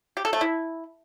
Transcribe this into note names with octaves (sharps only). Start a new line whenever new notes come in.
G4
A4
A3
E4